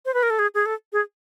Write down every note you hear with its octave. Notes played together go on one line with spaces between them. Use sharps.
C5
B4
A#4
A4
G#4
G#4
A4
G#4